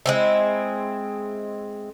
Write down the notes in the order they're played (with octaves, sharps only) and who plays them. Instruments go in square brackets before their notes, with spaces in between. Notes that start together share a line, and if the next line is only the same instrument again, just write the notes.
[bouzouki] G#3 C4 E4